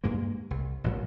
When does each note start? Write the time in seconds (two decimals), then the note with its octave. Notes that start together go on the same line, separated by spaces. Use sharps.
0.04 D2 G2 G#3 A#3
0.51 C2
0.84 A1 G2 A#2 F#3